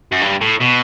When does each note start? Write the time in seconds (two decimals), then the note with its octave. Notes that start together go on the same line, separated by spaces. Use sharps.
0.12 F#2
0.21 G2
0.41 A2
0.61 B2